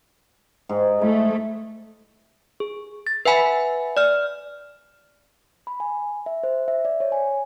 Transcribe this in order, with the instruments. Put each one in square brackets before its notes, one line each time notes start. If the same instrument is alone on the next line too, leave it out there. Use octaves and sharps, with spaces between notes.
[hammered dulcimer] G#2
[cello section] A3 [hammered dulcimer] E4
[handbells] G#4
A6
B4 E5 F#5 G#5 B5
D5 F6
[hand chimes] B5
G#5
E5
C5
E5
D5
C#5
G#5